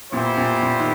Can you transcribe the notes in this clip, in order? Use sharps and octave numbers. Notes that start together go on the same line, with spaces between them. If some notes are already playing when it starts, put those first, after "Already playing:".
A#2 B3 E4 G4 C5
A#2
A#2
D#3